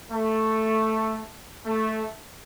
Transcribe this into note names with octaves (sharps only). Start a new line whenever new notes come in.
A3
A3